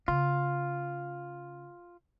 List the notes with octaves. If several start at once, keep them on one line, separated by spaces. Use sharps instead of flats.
C#3 F4